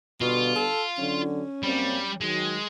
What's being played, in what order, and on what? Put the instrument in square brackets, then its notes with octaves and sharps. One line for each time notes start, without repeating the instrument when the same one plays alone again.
[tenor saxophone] B2 [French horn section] D3 G3 B3 [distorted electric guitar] F4
[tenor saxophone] A4
[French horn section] D3 F#3 [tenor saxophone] C#4
[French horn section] F#2 A#3 C4 [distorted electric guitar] G3
[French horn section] D#3 F#3 [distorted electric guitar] G#3